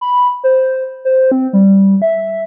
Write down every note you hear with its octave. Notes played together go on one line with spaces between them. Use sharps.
B5
C5
C5
C4
G3
E5